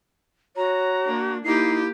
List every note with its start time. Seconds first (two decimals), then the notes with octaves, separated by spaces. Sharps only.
0.57 F#4 C#5 A#5
1.05 A#3 D4
1.45 A#3 D#4 E4 G4 C7